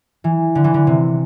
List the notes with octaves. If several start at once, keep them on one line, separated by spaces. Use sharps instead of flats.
E3
D3
E3
D3
C3